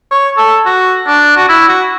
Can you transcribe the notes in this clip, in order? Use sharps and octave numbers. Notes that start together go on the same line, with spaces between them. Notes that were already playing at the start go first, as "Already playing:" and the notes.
C#5
A4
F#4
D4
F#4
E4
F#4